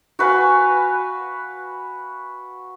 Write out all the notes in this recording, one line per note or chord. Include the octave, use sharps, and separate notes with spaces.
F#4 B4 F5 G#5